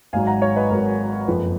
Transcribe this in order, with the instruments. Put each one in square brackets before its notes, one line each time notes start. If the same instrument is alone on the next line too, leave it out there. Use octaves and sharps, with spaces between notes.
[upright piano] G#1 G#2 F#3 F5 G#5
F#5 A#5
C#5 F5
B4 D#5
G#1 G#2 F#3 A#4
F#1 F2 F3 B4